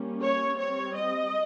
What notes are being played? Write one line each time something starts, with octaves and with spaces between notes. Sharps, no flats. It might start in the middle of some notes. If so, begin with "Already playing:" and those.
Already playing: G3 A#3 C#4
C#5
G3 C4 C#5
D#5